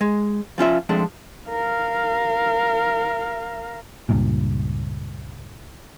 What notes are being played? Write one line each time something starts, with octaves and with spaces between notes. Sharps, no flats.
G#3
F3 C#4 F4 E5
F3 G#3 A3 C4 D4
A#4 F5
C#2 G2 A#2